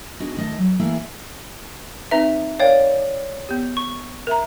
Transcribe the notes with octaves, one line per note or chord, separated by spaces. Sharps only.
B3 D4 D#4 F#4 G#4
D#3 A3 D#5 A5
F#3
E3 A3 A#3 E4 G#4 F5
C4 D#4 B4 E5 A#5
A#4 C#5 D5 F5 G5
B3 G4
C#6
A#4 E5 A#5